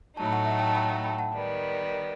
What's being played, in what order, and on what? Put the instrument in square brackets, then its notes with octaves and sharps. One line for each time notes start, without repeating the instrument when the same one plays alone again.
[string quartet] A2 F#3 A3 D#4 [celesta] A5
[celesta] B5
F#5 A5
E5
F#5
G5
A5
G5 B5
F#5 A5
G5 B5
F#5 A5
[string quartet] D#3 G3 B3